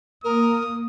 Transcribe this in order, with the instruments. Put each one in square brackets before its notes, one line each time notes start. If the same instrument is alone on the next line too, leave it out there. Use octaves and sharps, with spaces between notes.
[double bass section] A#3 [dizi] A#4 [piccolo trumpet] D#6